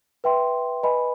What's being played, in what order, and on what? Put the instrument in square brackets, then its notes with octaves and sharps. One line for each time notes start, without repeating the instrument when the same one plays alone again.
[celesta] B4 E5 G5 C6
B4 D#5 G#5 B5